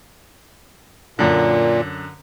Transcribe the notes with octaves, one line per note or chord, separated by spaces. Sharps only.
F#2 A#2 D3